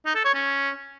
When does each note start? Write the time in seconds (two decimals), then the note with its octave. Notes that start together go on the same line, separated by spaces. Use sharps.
0.06 D#4
0.15 A4
0.25 C#5
0.34 C#4